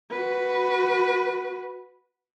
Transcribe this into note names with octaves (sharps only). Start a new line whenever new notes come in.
F#4 B4